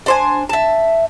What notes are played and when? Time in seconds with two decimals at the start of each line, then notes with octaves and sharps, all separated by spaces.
0.06 D4 C5 G#5
0.49 E5 A5